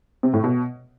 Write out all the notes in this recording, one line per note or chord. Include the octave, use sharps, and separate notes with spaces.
C3
A2
B2